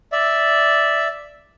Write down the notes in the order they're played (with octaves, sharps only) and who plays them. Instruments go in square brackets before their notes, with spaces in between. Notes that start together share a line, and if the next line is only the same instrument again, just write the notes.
[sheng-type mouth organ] D5 E5